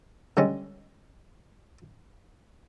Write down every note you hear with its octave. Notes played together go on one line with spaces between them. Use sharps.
D3 G3 G#3 C#4